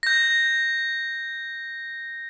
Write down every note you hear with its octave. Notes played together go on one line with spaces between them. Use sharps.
G6 A#6